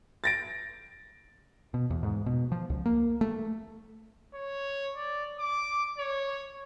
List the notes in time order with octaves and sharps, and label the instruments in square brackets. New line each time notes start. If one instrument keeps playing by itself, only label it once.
[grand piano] A6 A#6 D7
[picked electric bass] B2
E2
G#2
B2
F3
C#2
A#3
A3
[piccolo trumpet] C#5
D5
D6
C#5